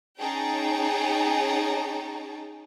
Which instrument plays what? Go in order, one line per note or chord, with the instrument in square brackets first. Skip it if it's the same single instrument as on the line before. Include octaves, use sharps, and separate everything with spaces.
[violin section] C#4 D#4 G#4 G5 A5 A#5